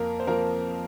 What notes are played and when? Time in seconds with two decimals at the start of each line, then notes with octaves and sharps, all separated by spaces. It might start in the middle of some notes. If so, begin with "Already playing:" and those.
Already playing: F2 A#3 A#4
0.20 C5
0.27 F3 A#3 A#4